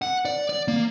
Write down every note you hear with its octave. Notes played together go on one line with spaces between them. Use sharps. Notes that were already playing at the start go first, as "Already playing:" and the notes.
F#5
D5
D5
A#3